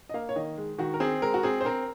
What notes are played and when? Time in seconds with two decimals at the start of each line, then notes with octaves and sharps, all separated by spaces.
0.09 D#5
0.14 A#3 F5
0.29 C#5
0.36 D#3 D#5
0.57 G#3
0.79 D#3 F#4
0.94 A#4
1.00 C4 G#4
1.22 G#3 A#4
1.34 F#4
1.43 C4 G#4
1.61 C5
1.65 C4 A#4